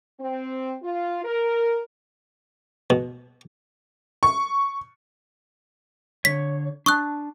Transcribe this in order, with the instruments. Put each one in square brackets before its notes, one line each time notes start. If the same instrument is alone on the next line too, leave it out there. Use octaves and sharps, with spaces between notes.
[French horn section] C4
F4
A#4
[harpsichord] B2
[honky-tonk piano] C#6
[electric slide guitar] D3 C#5 [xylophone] B6
[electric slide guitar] D4 A5 [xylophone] C#6 D#6 F#6